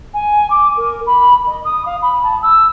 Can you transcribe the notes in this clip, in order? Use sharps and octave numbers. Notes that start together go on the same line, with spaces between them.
G#5
D6
A#4
B5
D#5
D#6
F5
B5
A5
E6